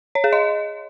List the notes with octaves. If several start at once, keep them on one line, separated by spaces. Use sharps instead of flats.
C#5
G#4
D#5